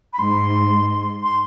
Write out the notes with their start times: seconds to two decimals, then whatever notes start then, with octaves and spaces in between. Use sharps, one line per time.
0.13 B5
0.19 G#2 C6
1.23 C6